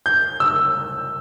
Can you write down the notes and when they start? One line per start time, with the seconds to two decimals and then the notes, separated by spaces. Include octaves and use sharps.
0.06 G6
0.40 E6